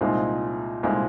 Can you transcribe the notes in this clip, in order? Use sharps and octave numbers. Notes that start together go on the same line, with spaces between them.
C2 A#2 G#3 C4 D#4
C2 A#2 G#3 C4 D#4